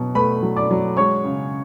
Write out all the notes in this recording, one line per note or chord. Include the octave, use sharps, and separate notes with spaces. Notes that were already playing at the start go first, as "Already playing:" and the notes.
Already playing: B2 F#3
A3 B4 B5
F#3
D5 D6
F#3
G#3 C#5 C#6
C#3